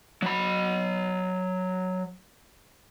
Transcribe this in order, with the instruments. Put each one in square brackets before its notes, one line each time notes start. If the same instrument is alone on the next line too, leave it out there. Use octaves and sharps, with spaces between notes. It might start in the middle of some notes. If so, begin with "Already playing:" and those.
[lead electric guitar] F#3 B5